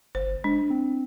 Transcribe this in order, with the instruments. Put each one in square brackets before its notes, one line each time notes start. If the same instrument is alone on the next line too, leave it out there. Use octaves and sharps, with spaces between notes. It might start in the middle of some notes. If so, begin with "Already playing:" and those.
[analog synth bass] G1 [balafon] C5
[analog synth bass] G#3 [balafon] D4
[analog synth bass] C4